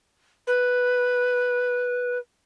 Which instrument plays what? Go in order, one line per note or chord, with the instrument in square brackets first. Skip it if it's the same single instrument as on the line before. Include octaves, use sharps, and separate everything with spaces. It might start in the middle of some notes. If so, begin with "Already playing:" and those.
[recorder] B4